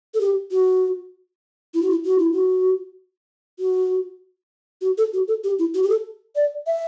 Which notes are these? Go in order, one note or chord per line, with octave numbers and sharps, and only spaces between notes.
A4
G4
F#4
E4
F#4
E4
F#4
E4
F#4
F#4
F#4
A4
F#4
A4
G4
E4
F#4
G4
A4
D5
E5